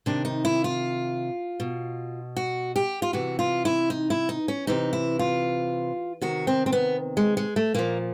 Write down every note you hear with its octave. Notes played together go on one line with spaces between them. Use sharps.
C3 D#3 D4
D#4
E4
F4
B2
F#4
G4
F4
C3 E3 F#4
F4
E4
D#4
E4
D#4
C#4
C3 E3 D#4
E4
F4
C3 D#3 F#4
C4
C4
B3
G#3
G#3
A3
A#2 F3 A#3